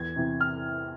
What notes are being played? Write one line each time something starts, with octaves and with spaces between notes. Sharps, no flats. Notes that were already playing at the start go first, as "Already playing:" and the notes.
Already playing: E2 G#6
C3 E3
F6